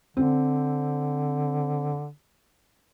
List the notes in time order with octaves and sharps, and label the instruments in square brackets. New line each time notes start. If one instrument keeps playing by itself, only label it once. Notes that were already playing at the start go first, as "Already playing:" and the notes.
[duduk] D3 [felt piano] C4